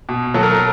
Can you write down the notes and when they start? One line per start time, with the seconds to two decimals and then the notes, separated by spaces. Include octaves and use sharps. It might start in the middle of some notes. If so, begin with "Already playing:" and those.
0.09 B2
0.34 F#3 A4
0.43 A#4
0.50 A4